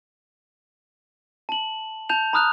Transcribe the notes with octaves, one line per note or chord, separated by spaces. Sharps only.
A5 F#7
A5 G6 F7
A#5 B5 D#6 F6 F#6 F7